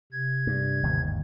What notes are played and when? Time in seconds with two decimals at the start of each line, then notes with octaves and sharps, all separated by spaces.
0.12 C3 G#6
0.47 G2
0.83 G1 D#2 G#2